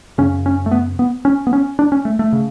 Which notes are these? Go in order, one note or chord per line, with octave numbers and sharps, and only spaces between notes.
F#2 C#3 C#4
C#4
A3
B3
B3
C#4
B3
C#4
D4
C#4
A3
A3
C#3